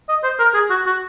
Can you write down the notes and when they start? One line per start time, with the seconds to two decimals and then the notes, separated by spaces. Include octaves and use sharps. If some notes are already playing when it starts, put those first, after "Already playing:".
0.09 D#5
0.24 C5
0.39 A#4
0.54 G#4
0.70 F#4
0.86 F#4